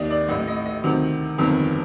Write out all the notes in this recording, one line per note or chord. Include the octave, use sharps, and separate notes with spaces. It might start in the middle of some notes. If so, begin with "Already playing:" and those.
Already playing: D#2 D#3 D5 D#5
D5
A1 A2 D#5
D#5
D#5
D2 C3 D#3
G1 F2 C3 D#3